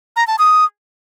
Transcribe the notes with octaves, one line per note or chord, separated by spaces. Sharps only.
A#5
A5
D#6